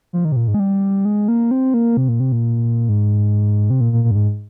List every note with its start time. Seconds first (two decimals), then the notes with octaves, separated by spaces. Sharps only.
0.13 F3
0.25 D#3
0.32 C3
0.36 A#2
0.48 G#2
0.54 G#3
0.60 G3
1.05 G#3
1.28 A#3
1.51 C4
1.74 A#3
1.97 C3
2.08 A#2
2.20 C3
2.32 A#2
2.89 G#2
3.70 C3
3.81 A#2
3.92 A#2
4.04 A#2
4.11 G2
4.15 G#2